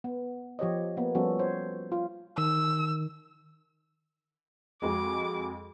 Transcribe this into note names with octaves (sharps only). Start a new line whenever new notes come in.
B3
F3 G4 C#5 D#5
A#3 B3
F3 G3 B3 C#4 F#4 A4
C5 C#5
F4
D#3 E6
F2 G#3 F#4 D6